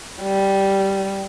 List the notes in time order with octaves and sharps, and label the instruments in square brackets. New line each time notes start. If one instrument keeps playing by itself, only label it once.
[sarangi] G3